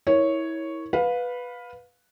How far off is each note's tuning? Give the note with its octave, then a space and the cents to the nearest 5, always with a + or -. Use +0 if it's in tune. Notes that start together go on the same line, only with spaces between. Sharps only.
E4 -25 A#4 +10 C#5 +0
B4 +0 F5 +25